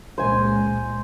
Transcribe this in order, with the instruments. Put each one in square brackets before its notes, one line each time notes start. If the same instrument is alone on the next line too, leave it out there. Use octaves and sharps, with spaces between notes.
[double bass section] C#2 A#2 G#3 [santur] C5 G#5